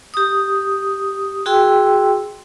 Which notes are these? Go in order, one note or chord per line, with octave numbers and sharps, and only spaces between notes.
G4 D#6
F#4 G#4 G5 C6 E6